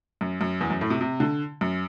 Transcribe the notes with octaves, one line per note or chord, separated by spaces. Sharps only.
F#2
F#2
E2
F#2
A2
C3
C3
D3
F#2